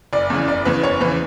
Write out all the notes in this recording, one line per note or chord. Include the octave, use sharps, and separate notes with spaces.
F#1 D5
E2 C#3 E3
F#1 D5
E2 C#3 E3 B4
F#1 C#5
E2 C#3 E3 B4